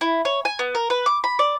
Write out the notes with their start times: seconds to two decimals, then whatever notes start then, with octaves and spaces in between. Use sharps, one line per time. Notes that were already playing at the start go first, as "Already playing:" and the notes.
0.01 E4
0.25 C#5
0.45 G#5
0.59 B3
0.75 A#4
0.90 B4
1.06 D6
1.24 B5
1.39 D5